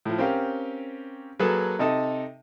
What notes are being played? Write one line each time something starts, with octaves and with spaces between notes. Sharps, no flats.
A2 F3
C4 C#4 G4 A#4 F5
F#3 A#3 G#4 A4 B4 A5
C3 D#4 A4 D#5 A5